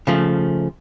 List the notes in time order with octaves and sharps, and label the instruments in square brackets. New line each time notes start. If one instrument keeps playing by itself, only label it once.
[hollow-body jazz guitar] C#3 F3 A3